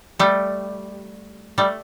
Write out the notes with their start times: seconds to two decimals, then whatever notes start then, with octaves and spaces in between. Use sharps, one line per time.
0.19 G3 A3
1.58 G3 A3